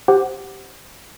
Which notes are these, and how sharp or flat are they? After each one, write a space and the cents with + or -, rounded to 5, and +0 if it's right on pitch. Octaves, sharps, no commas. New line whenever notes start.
G4 -5 C5 +0 F#5 +5